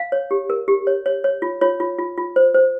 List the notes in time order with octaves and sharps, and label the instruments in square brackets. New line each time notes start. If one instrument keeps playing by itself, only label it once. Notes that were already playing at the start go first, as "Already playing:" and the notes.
Already playing: [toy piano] F5
C#5
G4
A#4
G4
C#5
C#5
C#5
F4
F4 C#5
F4
F4
F4
C5
C5